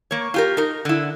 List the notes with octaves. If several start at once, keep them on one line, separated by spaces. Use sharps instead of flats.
A#3 C#5
F4 G4 A#4
D#4 A#4
D3 E4